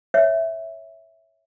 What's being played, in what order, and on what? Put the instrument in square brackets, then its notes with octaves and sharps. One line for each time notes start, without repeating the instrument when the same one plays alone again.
[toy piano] C#5 E5